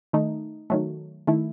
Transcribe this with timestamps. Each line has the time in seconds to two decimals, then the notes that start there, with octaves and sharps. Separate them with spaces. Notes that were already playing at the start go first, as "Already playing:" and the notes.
0.13 D#3 A3 D#4
0.70 D#3 F#3 A3
1.27 D#3 A3 E4